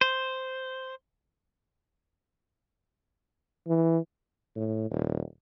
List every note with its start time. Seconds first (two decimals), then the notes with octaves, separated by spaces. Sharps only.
0.01 C5
3.67 E3
4.56 A2
4.91 D#1